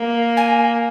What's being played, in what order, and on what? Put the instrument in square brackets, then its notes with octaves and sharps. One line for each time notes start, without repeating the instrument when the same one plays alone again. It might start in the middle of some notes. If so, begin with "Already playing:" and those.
Already playing: [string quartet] A#3
[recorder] G#5